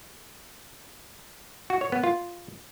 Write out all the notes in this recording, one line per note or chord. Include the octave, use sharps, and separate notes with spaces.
F#4
C#5
B3
F4